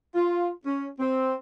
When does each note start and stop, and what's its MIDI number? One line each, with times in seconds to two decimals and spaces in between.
0.15 0.49 65
0.65 0.88 61
1.00 1.35 60